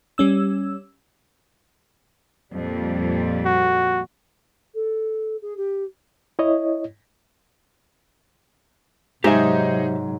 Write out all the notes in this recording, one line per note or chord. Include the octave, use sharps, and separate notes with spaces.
G3 C#4 E6
F2 A#2 G3
F#4
A4
G#4
G4
E4 C#5 D#5
G#2 C3 F#3 D#4 G4 G#4 C5 E5